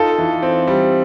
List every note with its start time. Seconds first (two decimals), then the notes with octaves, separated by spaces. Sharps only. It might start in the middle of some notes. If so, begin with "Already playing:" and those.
Already playing: D#4 F4 A4
0.18 E3
0.43 C4
0.67 G3